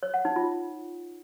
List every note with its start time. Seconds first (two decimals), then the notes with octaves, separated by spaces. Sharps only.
0.03 C#5
0.14 F#5
0.25 D#4
0.36 F4